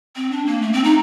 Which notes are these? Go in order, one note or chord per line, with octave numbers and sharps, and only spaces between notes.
C4
D4
A#3
A3
C4
D#4